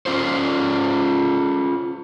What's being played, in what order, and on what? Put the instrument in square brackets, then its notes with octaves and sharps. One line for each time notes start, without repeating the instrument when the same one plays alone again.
[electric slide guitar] C#4 F4 C5